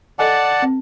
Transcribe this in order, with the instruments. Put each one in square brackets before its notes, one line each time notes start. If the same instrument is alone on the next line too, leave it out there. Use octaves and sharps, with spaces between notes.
[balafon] A4 D#5 G#5 [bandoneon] D5 F#5 A5
[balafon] C4